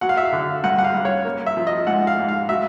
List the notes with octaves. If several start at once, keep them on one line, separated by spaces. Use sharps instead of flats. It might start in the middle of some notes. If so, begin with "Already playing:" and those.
F#3 F#5
F5
E5
F5
D3
G2 F#5
F#5
F5
G2
C#5
A#3
E5
F3
D#5
G#2 F#5
F5
G#2
F5
F#3 E5